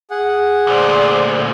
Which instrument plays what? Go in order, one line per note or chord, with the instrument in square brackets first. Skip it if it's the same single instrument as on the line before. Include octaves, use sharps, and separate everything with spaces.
[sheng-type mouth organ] G#4 F#5
[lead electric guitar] D2 A#2 [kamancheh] C5 D5